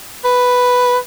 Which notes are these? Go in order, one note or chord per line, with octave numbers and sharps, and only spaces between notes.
B4